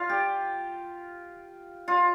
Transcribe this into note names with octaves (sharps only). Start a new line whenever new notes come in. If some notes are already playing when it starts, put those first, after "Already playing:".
Already playing: F4
G4
F4